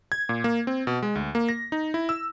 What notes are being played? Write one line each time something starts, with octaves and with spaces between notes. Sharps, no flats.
G#6
A#2
A#3
C4
B2
G#3
D2
A#3
A#6
D#4
E4
E6